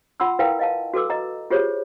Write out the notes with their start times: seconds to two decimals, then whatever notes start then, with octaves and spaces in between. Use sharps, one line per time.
0.20 F4 F#5 B5 C6 E6
0.39 E4 A#4 B4 F5 G5
0.59 D#5 F5 A5
0.94 F#4 A4 B4 D6 E6
1.10 D#5 A#5
1.50 F4 G4 G#4 C5 C#5